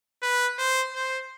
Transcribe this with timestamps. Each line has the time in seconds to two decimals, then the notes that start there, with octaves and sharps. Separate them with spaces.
0.22 B4
0.58 C5
0.93 C5